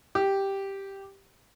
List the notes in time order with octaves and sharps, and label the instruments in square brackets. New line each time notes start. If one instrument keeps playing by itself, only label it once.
[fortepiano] G4